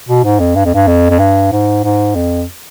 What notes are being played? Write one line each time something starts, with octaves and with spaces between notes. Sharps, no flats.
B2
G#2
F2
G2
F2
G2
F2
F2
G2
G#2
G#2
F2